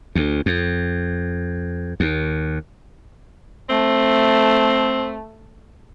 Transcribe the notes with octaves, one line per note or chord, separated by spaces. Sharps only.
D2
F2
D#2
A3 C4